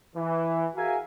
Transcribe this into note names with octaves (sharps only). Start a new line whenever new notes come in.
E3
F#4 G#4 A#4 E5 F5 G#5